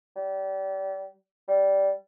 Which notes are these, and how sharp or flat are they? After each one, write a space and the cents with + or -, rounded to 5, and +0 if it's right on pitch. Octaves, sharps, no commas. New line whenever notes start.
G3 -30
G3 -15